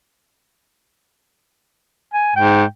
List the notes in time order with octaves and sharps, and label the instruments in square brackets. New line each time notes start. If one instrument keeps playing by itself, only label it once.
[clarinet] G#5
[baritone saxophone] G#2 [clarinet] G5